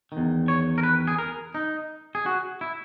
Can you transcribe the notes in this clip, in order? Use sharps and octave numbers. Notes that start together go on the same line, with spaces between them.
D#3
E2
C#5
A#4
B4
G#4
A#4
D#4
G#4
F#4
E4